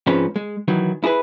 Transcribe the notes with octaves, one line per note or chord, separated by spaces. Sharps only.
G#2 F3 C4 C#4 B4
G#3
D#3 E3 F#3
E4 G#4 A4 B4